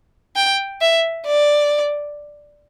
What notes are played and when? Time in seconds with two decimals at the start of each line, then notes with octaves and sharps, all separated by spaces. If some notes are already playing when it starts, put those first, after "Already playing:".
0.36 G5
0.81 E5
1.26 D5